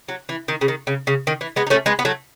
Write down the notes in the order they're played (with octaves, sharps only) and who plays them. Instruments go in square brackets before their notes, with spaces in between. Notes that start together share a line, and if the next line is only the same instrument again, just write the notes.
[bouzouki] F#3
E3
D#3
C#3
D#3
C#3
C#3
D#3
E3
G#3 B3
D#4
A3 C#4
G#3 B3
B3
F#3 A3